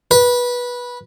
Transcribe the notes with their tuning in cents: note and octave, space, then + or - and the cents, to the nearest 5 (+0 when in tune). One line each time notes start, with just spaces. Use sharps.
B4 -15